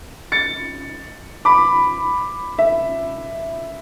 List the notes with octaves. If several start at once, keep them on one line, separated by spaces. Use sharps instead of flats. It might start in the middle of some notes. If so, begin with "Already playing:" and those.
A6 C#7
B5 D6
E5